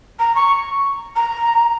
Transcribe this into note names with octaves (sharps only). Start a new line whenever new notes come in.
A#5
C#6
A#5